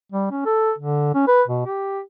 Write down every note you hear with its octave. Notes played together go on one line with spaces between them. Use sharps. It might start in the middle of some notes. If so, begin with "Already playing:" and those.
G3
C#4
A4
D3
C#4
B4
B2
G4